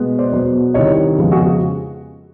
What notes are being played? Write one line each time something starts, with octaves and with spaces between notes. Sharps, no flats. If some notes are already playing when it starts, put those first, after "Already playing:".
Already playing: B2 G#3 B3
C5 D5
B2 F#3 B3
C2 C3 D#3 C#5 D#5
F2 C#3 F3 G#3 B3
F#4 G#4